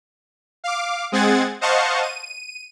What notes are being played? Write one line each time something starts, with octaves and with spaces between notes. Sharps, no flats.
F5 D6
G#3 C4 G#4 F#5 G#6 A6
C5 D#5 F5 F#5 A5 C#6
D#7